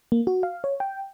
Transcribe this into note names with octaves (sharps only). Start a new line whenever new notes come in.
A#3
F#4
F5
C#5
G5